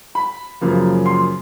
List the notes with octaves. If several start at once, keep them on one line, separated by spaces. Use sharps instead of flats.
B5
F#2 C#3 F3 A#3
C6